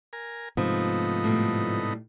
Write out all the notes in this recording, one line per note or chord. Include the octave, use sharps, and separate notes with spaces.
A#4 G#5
G#2 C3 F3 A3 B3 D#4
A2 G3